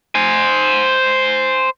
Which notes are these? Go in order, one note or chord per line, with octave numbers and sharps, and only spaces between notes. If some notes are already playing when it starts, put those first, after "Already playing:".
C5 G#5